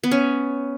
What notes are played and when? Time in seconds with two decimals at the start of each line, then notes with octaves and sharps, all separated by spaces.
0.04 B3
0.11 C#4